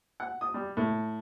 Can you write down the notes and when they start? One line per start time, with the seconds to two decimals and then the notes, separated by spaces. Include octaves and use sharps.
0.20 F#5
0.41 D#6
0.54 G3
0.77 A2